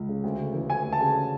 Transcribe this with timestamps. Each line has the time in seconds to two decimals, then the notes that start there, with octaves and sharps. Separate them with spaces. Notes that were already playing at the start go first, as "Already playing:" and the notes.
Already playing: C#2
0.09 C#3
0.24 D2
0.39 C#3
0.54 E3
0.69 D2 G#5
0.85 D2
0.93 A5
1.00 C#3